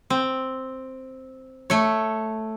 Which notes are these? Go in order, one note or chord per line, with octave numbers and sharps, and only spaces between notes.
C4
A3 C#5